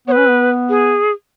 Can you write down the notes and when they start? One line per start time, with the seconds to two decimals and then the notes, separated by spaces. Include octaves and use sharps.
0.08 B3 C#5
0.12 B4
0.18 C#4
0.29 B3
0.69 G#4